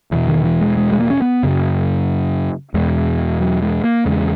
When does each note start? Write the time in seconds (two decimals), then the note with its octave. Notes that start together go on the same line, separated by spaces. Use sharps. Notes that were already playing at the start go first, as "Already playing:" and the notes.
0.11 E2 B2 E3
0.28 D#3
0.44 E3
0.61 G#3
0.77 G#3
0.92 G#3
0.99 A#3
1.10 C#4
1.22 B3
1.43 F#2 C#3
2.74 E2 B2 G#3
3.40 F#3
3.62 G#3
3.84 A#3
4.05 E2 C#3 G#3